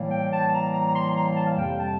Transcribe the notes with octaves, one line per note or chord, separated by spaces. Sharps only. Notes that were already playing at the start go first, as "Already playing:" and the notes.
Already playing: A2 E3 G3 A#3
G5
A5
A#5
A#5
A#5
C6
A#5
A5
F5
F2 C3 G3 A#3 G5
A5